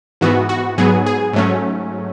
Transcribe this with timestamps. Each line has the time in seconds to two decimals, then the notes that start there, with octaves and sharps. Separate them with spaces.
0.21 G#2 E3 B3 F#4
0.49 F#4
0.78 G#2 F#3 B3 G#4
1.06 G#4
1.33 G#2 F#3 A3 C#4